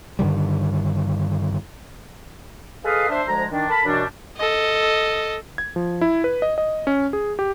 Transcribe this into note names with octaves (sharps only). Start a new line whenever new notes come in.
G2 D3 D#3 G3
G#4 A4 B4 D#5 F5
D4 C5 E5
D2 F3 G#3 A#5
D#3 D4
A4 A#4 A5 B5
F#2 B2 E3 G3 D4
A4 D#5
G#6
F3
E4
B4
D#5
D#5
C#4
G#4
G4